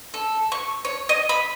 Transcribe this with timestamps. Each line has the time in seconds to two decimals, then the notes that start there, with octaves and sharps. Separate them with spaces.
0.14 A4
0.52 C#6
0.85 C#5
1.09 D#5
1.29 B5